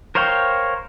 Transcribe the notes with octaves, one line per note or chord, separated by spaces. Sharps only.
A#4 C5 C#5 F5 G5